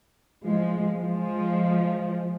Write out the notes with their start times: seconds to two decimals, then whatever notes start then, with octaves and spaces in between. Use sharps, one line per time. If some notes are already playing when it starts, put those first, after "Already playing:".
0.45 F3 G#3
0.99 F3 G#3